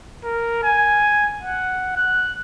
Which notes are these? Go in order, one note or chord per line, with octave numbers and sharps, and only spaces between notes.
A#4
G#5
F#5
F#6